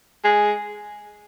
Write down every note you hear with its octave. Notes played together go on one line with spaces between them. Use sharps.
G#3